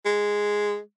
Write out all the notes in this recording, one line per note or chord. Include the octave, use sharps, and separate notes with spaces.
G#3